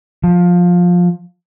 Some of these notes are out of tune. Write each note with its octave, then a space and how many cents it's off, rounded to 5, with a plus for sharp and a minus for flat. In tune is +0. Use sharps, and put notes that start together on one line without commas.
F3 +15